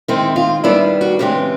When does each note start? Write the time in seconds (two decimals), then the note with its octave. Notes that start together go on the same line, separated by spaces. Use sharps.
0.08 D#3 G#3 C4 E4
0.36 F4
0.64 D#3 G3 B3 D4 E4
1.01 F#4
1.19 C#3 E3 G#3 C4 G4